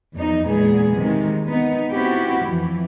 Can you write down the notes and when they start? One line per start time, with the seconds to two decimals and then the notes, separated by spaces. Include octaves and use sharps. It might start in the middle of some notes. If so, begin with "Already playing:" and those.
0.16 E2 F3 D#4
0.47 E2 A#2 G#3 B3 G#4
0.98 C3 D#3 G#3
1.48 B3 D#4
1.92 B3 C4 E4 F#4 G4
2.44 F2 E3